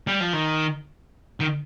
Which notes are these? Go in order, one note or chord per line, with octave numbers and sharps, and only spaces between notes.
G3
F3
D#3
D#3